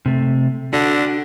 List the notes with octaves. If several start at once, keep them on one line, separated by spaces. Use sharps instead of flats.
C3 A3
D3 D4 F#4